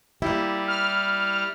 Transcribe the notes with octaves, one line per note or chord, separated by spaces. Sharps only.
G3 A#3 E4 G4
F6